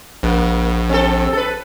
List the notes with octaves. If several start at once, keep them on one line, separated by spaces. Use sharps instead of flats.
A#1 A#3
C4 A4
A4 B4